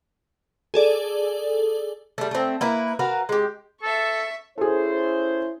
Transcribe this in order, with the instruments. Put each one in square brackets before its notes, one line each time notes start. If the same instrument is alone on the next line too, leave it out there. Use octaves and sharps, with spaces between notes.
[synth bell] G#4 A4 D5
[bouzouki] G3 A3
A3 C4
A#3 E4 B4
F#4 A#4 B4 F5
G#3 G4
[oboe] A4 [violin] E5 C#6
[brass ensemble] C#4 E4 C5 [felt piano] G#4 A4